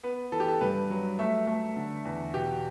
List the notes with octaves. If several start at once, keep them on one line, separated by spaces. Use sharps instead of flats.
B3 B4
E3 A4
G4
A4
G2 B4
F#3
A3 E5
A3
D3
E2
B2 G4